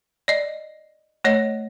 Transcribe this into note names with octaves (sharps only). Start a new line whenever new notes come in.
D5 D#5
A3 C#5 D#5